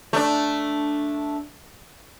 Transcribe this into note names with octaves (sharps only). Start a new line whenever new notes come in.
A3 D4